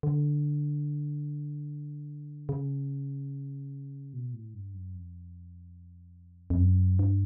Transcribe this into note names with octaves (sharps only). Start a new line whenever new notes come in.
D3
C#3
B2
A2
G2
F#2
F2
F2
F#2
G2